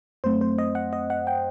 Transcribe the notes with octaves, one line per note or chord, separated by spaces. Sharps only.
F#2 F#3 A3 C4 C5
C5
D#5
F#5
D#5
F#5
G5